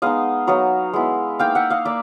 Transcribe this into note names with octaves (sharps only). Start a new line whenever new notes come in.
G#3 B3 D#4 D#5 F5
F#3 B3 D#4 D#5 F5
G#3 B3 E4
A#3 D#4 F5 G5
E5 F#5
D#5 F5
A#3 D5 E5